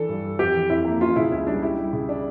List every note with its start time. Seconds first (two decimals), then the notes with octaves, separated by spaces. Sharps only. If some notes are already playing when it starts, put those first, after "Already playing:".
Already playing: E3 D4 A4
0.09 G2
0.24 G3
0.39 F2 G4
0.55 E3
0.70 F2 E4
0.85 A#3
1.01 C#4 F4
1.16 C#3 E4
1.32 C#2 E4
1.47 G3 D4
1.62 E4 G4
1.78 G3
1.93 C#3
2.09 D4